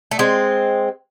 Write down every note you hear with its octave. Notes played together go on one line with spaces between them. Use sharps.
A3
G#3 C4